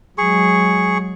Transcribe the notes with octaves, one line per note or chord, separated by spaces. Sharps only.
F#3 G#3 G#4 C#6